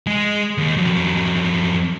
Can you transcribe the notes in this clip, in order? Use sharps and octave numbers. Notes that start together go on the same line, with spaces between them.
G#3 G#4
D#2
F2 F#3